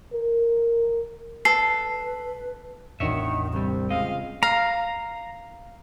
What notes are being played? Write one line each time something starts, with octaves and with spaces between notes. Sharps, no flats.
A#4
A4 B4 C7
A1 E2 D#3 D4 F#4 C#5 E5
C2 G3 C4
C#2 G#3 D#5 F5
F5 A#5